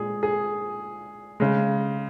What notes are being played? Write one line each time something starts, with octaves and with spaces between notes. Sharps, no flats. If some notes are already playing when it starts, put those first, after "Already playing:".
Already playing: A#2 G#3 G#4
G#4
C#3 G#3